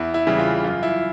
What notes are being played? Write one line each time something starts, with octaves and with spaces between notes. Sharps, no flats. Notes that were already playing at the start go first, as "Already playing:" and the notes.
Already playing: E2 E4
E4
C#3 E3 G3
F4
F#2 F4
E4